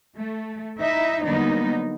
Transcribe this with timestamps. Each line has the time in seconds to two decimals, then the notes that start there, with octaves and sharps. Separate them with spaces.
0.18 A3
0.80 D#4 E4 E5
1.25 D3 F#3 G3 A#3 B3 D#4